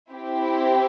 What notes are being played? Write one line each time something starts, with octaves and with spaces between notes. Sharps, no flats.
C4 E4 G4